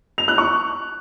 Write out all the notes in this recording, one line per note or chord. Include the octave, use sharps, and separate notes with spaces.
F7
F#6
C#6